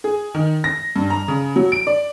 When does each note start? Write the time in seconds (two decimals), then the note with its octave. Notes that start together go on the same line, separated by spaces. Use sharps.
0.04 G#4
0.35 D#3
0.64 A#6
0.96 G2
1.10 A#5
1.28 C#3
1.56 F#3
1.72 D7
1.87 D5